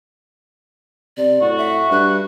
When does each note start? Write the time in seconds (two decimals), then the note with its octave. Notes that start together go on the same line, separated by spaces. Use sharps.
1.17 C3 D5
1.41 A2 F#4
1.58 E5
1.91 G2 F#6